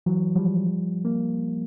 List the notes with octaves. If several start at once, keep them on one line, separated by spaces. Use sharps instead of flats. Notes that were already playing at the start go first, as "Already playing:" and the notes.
E3 F#3
F3 G3
A#3